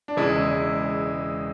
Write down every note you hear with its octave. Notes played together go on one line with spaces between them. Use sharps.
D4
E1 E2 C#3 E3 G#3 E4